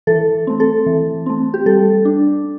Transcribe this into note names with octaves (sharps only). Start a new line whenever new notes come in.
E3 A4
A3 C4
A4
E3
A3 C4
G4
G3 A4
D4